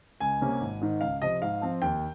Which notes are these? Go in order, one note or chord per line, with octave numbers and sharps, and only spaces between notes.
C#2 G#5
C3 G3 A#3 C#4
G#1
G#2 D#3
C#2 F5
C3 F3 D#5
G#2 F5
F3 C4
D#2 G5